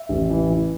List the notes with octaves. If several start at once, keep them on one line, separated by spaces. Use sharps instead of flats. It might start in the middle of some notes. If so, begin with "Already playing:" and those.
Already playing: E5
A1
E3
E3